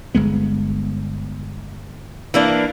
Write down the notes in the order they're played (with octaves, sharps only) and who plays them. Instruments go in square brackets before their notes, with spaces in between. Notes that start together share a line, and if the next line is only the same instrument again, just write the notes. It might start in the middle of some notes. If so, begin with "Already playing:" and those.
[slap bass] G1 G#3 B3
[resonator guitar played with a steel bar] E3 A#3 D4